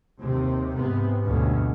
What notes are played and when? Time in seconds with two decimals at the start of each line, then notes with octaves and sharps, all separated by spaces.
0.21 D#2 C3
0.74 G#2 C3 B3
1.24 D2 G2 B2 C#4